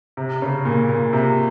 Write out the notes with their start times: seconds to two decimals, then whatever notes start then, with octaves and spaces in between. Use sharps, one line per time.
0.17 C3
0.42 C#3
0.65 A#2
0.89 A#2
1.13 C3